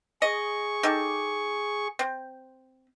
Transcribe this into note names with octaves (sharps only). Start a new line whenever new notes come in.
G#4 D#5 C#6
D#4 G4 A4
C4